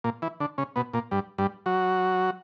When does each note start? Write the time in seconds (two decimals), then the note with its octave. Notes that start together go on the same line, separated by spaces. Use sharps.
0.04 A#2 A#3
0.22 E3 E4
0.40 D3 D4
0.58 C#3 C#4
0.76 B2 B3
0.94 A#2 A#3
1.11 G2 G3
1.38 G2 G3
1.66 F#3 F#4